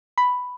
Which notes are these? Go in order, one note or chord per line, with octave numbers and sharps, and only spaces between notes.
B5